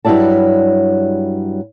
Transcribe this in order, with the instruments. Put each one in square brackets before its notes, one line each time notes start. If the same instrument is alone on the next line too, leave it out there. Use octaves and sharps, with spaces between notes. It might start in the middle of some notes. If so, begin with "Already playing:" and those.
[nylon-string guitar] G2 F#3 G3 E4 D5 A5